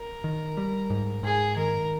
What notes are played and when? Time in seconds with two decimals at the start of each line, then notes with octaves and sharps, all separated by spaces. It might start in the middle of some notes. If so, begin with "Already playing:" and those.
Already playing: A#4
0.24 D#3
0.57 G3
0.90 G#2
1.23 G#2 G#4
1.56 D#3 A#4